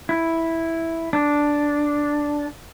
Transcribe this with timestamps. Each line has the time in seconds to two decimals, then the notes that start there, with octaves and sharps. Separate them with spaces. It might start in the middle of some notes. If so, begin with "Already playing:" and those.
0.09 E4
1.13 D4